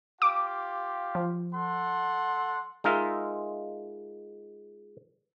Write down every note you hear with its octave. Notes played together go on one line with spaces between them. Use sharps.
F4 G4 F5 D6
F3
A4 F#5 C6
G#3 D#4 F4 A#4 E5